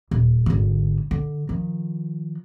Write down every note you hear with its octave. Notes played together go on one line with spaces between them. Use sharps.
D#1
G#1 D3
D3
D#3 F3